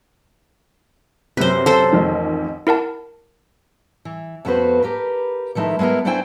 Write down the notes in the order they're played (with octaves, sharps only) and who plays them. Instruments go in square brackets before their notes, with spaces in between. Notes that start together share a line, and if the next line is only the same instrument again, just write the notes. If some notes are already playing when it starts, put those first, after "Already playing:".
[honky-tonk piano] F#2 C3 [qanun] B4 C5
[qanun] A4 C5
[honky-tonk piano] A1 F2 D#3
[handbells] E4 A#4 F#5 A5
[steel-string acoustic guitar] E3
F2 A3 B3 F#4 B4 C5
G4 A#4 B4
D#3 F3 A3 D#4 E4
G#3 A3 B3 E4 A#4
A3 D4 E4 C5 G5 G#5